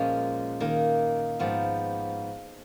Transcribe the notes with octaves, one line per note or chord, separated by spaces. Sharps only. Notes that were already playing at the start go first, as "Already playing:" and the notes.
Already playing: A#2 F3 G#3 C#4
D#3 A#3 D#4
G#2 F3 B3